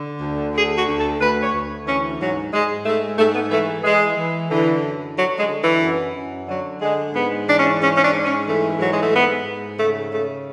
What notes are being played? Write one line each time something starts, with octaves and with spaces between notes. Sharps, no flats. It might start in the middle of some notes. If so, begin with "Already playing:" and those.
Already playing: D3
D2
D3 G#4
F#4
D2
A4
D2 B4
C#5
D2
E3 C#4
G#2 F#3
G#2 G#3
G#2 A3
G#2 A3
B3
E3 A3
E3 G#3
E3
D3 E3
F#2
D3 F#3
G#3
D3
E3
F#2
F#2
D3 F#3
D3 G#3
G#2 B3
E3 D4
C#4
D4
G#2 C#4
C#4
D4
G#2
C#4
E3 A3
G#2 F#3
G#3
A3
G#2 B3
G#2
C#3 A3
C#3 A3